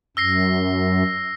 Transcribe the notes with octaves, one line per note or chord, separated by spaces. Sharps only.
F#2 E6 A#6 C7